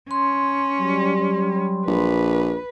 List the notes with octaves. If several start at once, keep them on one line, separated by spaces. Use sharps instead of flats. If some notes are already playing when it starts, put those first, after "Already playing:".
C#4 C6
F#3 G3
A#1 B4